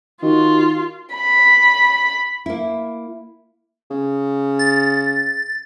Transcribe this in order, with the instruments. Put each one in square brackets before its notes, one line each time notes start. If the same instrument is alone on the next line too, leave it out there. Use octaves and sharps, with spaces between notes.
[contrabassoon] D#3 [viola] F4 [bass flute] F#4
[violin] B5
[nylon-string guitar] A#3 E4
[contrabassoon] C#3
[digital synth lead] A6